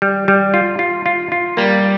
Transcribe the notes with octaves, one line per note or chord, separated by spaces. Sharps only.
G3
G3
F4
F4
F4
F4
G3 A#3